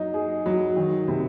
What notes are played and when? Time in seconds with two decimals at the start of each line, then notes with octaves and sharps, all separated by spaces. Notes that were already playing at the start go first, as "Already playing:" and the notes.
Already playing: F#3 D#4
0.14 G#4
0.46 F#3
0.76 D#3
1.08 C3